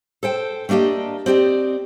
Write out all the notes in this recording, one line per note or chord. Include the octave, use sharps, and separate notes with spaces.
A4 C5 G5
A3 A#3 D4 G4 D#5
C4 G4 D5 D#5